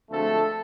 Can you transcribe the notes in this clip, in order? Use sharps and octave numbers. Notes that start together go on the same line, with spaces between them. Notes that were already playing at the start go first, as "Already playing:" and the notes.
D2 D3 F3 G#3 A3 C4 A4